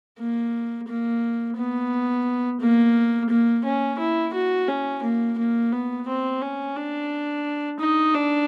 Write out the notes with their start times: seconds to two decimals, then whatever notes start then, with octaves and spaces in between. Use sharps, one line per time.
0.19 A#3
0.88 A#3
1.57 B3
2.61 A#3
3.30 A#3
3.65 C#4
3.99 E4
4.34 F#4
4.68 C#4
5.03 A#3
5.38 A#3
5.72 B3
6.07 C4
6.41 C#4
6.76 D4
7.80 D#4
8.14 D4